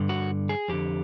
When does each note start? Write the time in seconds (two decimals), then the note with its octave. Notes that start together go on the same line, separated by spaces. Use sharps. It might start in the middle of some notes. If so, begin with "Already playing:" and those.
Already playing: G2 D3
0.09 F#4
0.49 G#4
0.68 F2 D3 G4